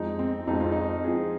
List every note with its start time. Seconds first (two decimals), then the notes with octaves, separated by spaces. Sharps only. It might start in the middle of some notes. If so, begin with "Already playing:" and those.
Already playing: F2 F3 G#3 D#4
0.19 C4
0.47 F2 F3 G#3 D#4
0.60 F4
0.72 D#4
1.04 F3 C4 G#4